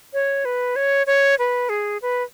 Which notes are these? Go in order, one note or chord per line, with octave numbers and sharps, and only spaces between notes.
C#5
B4
C#5
C#5
B4
G#4
B4